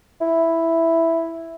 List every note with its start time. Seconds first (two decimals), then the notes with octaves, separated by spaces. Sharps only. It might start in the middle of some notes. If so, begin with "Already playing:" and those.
0.21 E4